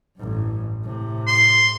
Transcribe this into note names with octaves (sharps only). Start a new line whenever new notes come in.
A1 G2
A2 C3
C6